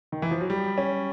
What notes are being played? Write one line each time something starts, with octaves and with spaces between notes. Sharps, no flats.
D#3
E3
F3
F#3
G3
C#4